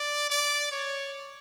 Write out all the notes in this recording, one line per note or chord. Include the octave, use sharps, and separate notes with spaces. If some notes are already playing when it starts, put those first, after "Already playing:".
Already playing: D5
D5
C#5